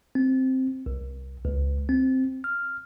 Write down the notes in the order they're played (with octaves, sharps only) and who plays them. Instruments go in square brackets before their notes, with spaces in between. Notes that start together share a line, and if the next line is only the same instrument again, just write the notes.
[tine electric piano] C4
C2
C#2
C4
F6